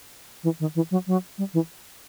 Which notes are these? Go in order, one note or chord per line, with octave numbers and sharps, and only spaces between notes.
E3
D#3
E3
F#3
F#3
G3
E3